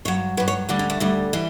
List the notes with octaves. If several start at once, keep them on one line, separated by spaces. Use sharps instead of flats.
G2 F#3 C#5
G2 F#3 B4
C#5
D2 D3 G3 D4
C#4
A3
D2 D3 G3
E3 G3